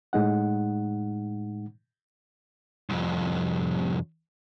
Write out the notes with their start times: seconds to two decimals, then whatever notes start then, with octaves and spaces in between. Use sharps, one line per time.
0.13 A2 G#3 D#4 F#5
2.90 C2 F2